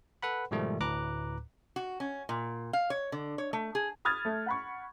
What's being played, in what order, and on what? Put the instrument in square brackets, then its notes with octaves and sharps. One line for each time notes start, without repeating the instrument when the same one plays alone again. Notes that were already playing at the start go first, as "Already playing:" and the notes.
[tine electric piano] A4 B4 F#5 B5
G#2 B2 D#3 F3 G3 A3
D2 A2 B4 A#5 D6 F#6
[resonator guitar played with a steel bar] F#4
C#4
A#2
F5
C#5
D3
C#5
A3
G#4
[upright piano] B5 D#6 F6 G#6 A6
A3
F#5 B5 C#6